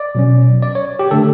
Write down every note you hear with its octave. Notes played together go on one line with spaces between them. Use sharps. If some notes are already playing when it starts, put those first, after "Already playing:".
Already playing: D5
B2 F#3 C#4
D5
C#5
G4
D3 A3 D4 A4